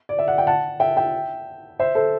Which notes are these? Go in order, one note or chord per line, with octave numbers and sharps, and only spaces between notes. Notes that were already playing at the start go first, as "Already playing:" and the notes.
D5
E5
F#5
G5
F#5 A5
E5 G5
E5 G5
C5 E5
A4 C5